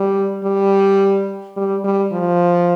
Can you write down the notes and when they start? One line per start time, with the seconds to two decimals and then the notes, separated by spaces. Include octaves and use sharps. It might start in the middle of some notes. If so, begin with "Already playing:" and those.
Already playing: G3
0.44 G3
1.56 G3
1.84 G3
2.12 F3